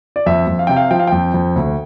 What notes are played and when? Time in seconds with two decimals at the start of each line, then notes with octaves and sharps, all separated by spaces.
0.16 D5
0.26 F2 E5
0.47 F2
0.59 F5
0.67 C3 G5
0.77 F5
0.91 F3 G5
0.99 F5
1.07 F2 G5
1.34 F2
1.56 D2